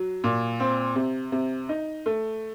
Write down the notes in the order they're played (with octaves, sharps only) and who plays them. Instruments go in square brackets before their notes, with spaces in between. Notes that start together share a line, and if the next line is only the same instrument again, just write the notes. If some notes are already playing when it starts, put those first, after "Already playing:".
Already playing: [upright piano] F#3
A#2
C4
C3
C3
D#4
A3